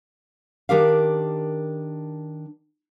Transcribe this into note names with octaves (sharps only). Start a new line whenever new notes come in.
D#3 D4 G4 A#4 F5